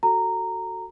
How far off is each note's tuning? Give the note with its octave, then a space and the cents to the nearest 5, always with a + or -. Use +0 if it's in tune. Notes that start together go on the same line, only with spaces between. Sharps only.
F#4 +0 A4 +15 A#5 -10